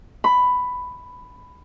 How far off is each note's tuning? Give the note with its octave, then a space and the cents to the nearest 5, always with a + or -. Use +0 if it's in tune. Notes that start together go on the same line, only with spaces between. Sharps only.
B5 +10